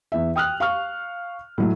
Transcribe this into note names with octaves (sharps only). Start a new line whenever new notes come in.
E2 E5
G5 D#6 F6 F#6
F5 C#6 F6
A2 F#3 A3